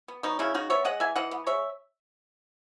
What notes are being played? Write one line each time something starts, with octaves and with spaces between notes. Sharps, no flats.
B3
F#3 B3 D#4
C#3 C#4 E4
C#3 D#4 F#4
B3 C#5 E5
G#3 D#5 F#5
E3 E5 G#5
E3 D#5 F#5
B3
G#3 C#5 E5